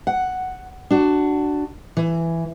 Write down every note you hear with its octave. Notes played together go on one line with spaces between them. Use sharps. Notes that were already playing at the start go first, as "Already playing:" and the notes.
F#5
D4 F#4
E3